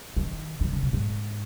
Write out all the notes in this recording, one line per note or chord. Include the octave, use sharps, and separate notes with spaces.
D#3
D#3
C#3
B2
G#2